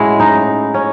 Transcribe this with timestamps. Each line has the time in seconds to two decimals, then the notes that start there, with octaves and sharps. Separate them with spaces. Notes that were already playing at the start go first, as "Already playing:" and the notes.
Already playing: A2 F#3 G#3 C#4 E4
0.20 D#4
0.74 C#4